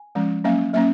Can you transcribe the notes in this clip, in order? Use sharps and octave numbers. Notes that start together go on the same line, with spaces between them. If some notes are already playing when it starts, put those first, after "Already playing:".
Already playing: G#5
F3 G#3 C#4
F#3 A#3 C#4 F5
F#3 A#3 C#4 E5